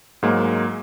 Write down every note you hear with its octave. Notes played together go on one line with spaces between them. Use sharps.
G#2 F#3 G#3 A#3